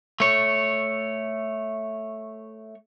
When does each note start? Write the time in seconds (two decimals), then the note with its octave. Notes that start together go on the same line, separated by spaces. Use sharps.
0.20 A3 C#5